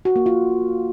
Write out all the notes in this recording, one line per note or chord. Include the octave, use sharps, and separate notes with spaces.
F#4
A#3
F4